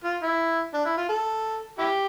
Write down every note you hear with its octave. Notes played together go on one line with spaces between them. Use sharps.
F4
E4
D4
E4
F4
A4
E4 G4